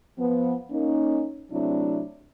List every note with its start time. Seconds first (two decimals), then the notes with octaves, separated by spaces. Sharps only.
0.18 F3 B3
0.71 A#3 C#4 D#4
1.51 C3 F#3 A3 C4 D4 E4